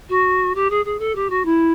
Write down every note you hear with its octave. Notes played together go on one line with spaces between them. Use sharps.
F#4
G4
G#4
G#4
A4
G4
F#4
E4